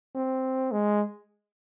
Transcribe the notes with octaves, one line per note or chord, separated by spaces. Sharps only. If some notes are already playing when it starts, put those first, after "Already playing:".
C4
G#3